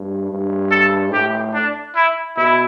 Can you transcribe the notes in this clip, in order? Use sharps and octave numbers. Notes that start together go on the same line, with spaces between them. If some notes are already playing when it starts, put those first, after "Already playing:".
Already playing: G2
G2
A4
A2 G4
D4
E4
B2 E4